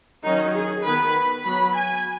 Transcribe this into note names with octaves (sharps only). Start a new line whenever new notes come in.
D#3 F#3 C#4 D#4
G#4
D#3 B3 B4
F#3 B3 B5
G#5